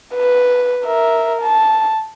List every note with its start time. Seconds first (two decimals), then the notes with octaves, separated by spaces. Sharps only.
0.15 B4
0.85 A#4 E5
1.42 A5